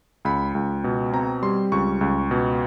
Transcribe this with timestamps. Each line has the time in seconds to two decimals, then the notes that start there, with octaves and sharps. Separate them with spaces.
0.25 C#2 B5
0.55 C#2
0.84 B2
1.13 C4 A#5
1.42 G3 C6
1.72 C#2 C#6
2.01 C#2
2.31 B2